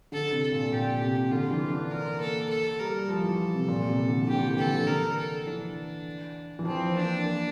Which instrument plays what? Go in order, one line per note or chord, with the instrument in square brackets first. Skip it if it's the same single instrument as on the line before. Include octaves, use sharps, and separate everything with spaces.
[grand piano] D3 [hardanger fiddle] A4
[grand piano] C3
[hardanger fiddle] A4
[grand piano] A#2
[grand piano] A#2 [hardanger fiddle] G4
[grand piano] C3
[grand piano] D3 [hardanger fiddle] F4
[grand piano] E3
D4
[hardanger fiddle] A#4
[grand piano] A#3 [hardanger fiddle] A4
[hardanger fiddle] A4
[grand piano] G3 [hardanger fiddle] A#4
[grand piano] F3 [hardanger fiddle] A4
[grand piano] E3
C3
A#2
C3
D3
E3
[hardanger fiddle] G4
[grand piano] D3
E3
[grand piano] D3 [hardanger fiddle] A4
[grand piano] E3
[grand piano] D3 [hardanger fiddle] A#4
[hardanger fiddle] A4
[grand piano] E3 [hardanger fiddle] D4
[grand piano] E3
[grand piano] F3 [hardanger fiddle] C4
[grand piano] A#3 [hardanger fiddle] D4
[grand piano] A#3